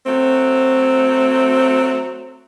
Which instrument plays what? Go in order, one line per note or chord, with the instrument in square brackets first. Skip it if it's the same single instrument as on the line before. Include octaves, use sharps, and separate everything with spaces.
[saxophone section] F#3 A3 C4